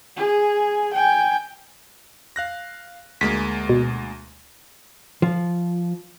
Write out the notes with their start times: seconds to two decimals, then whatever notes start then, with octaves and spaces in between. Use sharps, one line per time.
0.16 G#4
0.93 G5 G#5
2.36 F5 F#6 A#6
3.21 D2 G#3 A#3 B6
3.69 B2
5.22 F3